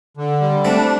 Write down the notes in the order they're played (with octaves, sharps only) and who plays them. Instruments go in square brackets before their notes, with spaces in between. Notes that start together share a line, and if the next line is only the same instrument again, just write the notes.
[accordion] D3
G3
[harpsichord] A3 C4 [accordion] D4